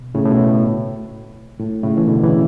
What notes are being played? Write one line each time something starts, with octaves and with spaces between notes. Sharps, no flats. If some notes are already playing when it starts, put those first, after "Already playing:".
Already playing: B2
A2 C#3
A2
B2
A2
A2 C#3
E3
B2 D3
C#3 E3